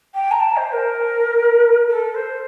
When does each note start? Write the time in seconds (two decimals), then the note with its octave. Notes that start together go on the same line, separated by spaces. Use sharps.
0.14 G5
0.31 A#5
0.40 A5
0.56 C5
0.72 A#4
1.89 A4
2.14 C5